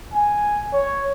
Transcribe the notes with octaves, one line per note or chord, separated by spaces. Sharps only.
G#5
C#5